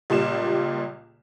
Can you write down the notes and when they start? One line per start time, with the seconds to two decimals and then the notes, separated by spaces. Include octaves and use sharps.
0.10 C#2 A#2 G3 E7